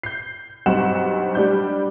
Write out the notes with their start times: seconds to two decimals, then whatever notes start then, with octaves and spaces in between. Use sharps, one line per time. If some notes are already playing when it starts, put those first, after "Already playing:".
0.03 G6 C7
0.66 B1 G2 C4 C5 F#5 E7
1.35 G3 D4 G6